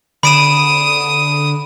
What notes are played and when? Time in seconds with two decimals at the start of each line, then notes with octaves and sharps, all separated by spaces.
0.23 D3 B5 D#6 D7 E7